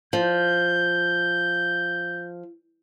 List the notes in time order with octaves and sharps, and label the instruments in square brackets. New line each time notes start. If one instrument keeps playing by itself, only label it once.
[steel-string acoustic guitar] F3 [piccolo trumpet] G6